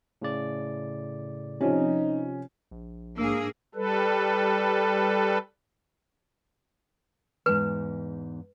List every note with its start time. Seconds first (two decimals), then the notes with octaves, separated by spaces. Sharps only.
0.22 A2 C#3 D5
1.61 C3 F3 C#4 D#4
2.71 A#1
3.18 G#2 A#3 D4 G#4 E6
3.75 G3 A4 B4
7.46 E2 G#2 B4